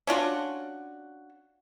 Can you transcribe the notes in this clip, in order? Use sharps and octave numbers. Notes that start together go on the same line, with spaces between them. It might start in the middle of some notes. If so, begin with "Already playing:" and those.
C#4 D4 F4 F#4